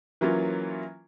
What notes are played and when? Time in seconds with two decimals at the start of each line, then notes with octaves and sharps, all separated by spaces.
0.21 E3 F#3 A#3 C#4 F4